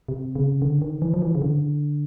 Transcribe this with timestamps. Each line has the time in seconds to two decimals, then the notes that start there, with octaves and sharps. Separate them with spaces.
0.08 C3
0.35 C#3
0.62 D3
0.82 D#3
1.02 E3
1.14 F3
1.22 E3
1.35 C#3
1.42 D3